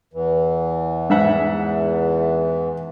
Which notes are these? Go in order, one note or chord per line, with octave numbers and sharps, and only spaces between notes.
E2 E3
G#2 E5 F#5